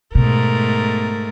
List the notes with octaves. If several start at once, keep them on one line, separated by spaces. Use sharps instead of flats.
G#2 B2 A3 A#4